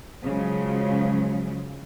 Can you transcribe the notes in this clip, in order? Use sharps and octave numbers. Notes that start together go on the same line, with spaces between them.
C#3 F3 F#3 G#3